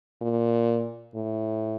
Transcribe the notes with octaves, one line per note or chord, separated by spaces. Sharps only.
A#2
A2